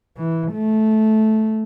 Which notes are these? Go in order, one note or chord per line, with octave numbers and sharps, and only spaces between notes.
E3
A3